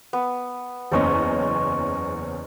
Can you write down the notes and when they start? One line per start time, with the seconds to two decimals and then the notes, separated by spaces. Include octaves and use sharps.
0.13 B3
0.92 F#1 E2 C#4 C5 C#5 D#5